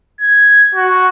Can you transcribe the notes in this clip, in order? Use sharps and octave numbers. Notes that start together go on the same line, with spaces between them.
G#6
F#4